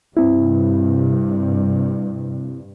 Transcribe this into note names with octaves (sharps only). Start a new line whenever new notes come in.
G2 C3 C4 E4